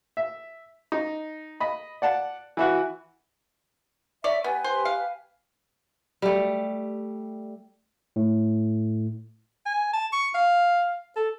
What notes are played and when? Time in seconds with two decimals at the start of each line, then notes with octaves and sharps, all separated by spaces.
0.17 E5
0.92 D#4
1.60 D#5 B5
2.02 D5 F#5 A5
2.57 E3 E4 F#4
4.24 C#5 D5 E5
4.44 B3 G4 B4 G#5
4.64 C5
4.85 F5
6.22 G3 A3
8.16 A2
9.66 G#5
9.93 A5
10.13 C#6
10.35 F5
11.16 A4